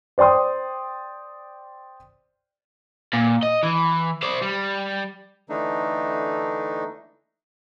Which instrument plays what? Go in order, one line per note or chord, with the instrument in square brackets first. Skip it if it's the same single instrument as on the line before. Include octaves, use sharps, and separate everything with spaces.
[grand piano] C5 D5 G5 C6 D#6
[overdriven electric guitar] A#2
D#5
E3
C5 D5
G3
[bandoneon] D3 E3 A3 D4 D#4